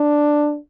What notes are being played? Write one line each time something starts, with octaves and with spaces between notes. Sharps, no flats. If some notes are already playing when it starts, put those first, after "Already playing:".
Already playing: D4